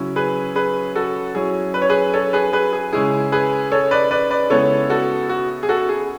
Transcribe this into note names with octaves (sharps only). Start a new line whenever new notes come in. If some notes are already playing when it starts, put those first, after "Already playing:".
Already playing: C#3 F#3 C#4 E4
G#4 B4
G#4 B4
F#4 A4
F#3 C#4 E4 G#4
B4
C#5
G#4 B4
A4 C#5
G#4 B4
G#4 B4
G#4
C#3 G#3 C#4 E4 G#4
G#4 B4
A4 C#5
B4 D5
B4 D5
B4 D5
C#3 G#3 B3 E4 A4 C#5
F#4 A4
F#4
G#4
F#4 A4
G#4